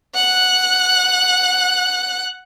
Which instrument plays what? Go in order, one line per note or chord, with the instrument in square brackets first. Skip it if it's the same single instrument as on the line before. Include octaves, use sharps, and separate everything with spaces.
[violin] F#5 F#6